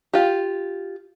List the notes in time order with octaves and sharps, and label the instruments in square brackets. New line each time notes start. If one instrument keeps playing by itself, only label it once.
[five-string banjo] F4 G4